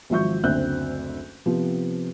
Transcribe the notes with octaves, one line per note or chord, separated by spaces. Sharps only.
G#1 F3 F#3 E5 C#6 G6
F#1 D2 C4 E5 F#6 G6
C3 F3 B3 C4